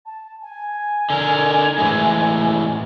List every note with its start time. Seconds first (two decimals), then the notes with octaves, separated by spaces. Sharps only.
0.05 A5
0.41 G#5
1.10 D3 A#4
1.78 A2 E3 G#3